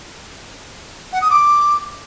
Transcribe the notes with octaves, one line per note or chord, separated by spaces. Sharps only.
F#5
D#6
D6